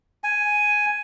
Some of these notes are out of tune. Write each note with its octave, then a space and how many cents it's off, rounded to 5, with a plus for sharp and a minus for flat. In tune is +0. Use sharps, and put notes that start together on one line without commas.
G#5 +5